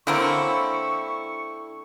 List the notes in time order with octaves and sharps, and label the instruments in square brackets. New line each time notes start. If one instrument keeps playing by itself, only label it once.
[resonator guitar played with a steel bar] D3 [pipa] F#3 A#3 C4 [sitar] E4 [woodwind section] C#6